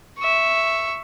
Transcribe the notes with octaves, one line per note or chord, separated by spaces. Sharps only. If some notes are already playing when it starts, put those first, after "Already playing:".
E5 C#6